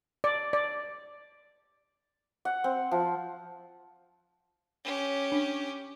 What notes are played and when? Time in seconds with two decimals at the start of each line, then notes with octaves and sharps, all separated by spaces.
0.24 D5
0.53 D5
2.45 F#5
2.64 C4
2.91 F3
4.84 C#4 G4
5.32 D4